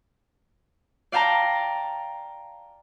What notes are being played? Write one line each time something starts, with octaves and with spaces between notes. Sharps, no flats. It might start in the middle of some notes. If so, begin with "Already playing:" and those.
D5 F5 G5 A5 A#5